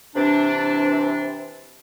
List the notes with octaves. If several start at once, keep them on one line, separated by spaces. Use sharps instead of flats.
C3 E3 D4